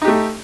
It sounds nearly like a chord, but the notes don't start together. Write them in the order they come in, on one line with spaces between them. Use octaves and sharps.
D#4 G4 A3